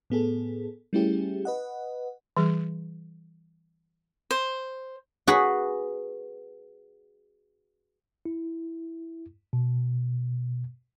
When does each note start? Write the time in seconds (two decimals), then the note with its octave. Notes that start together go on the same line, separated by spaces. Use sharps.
0.10 A2 B3 G#4 A4
0.93 G3 A3 C#4 E4 G4 G#4
1.45 B4 D#5 F#5
2.37 E3 G3 G#4
4.31 C5
5.27 F#4 G#4 B4 F#5
8.25 E4
9.53 B2